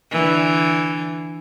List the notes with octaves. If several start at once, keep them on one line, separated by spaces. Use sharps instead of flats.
D3 E3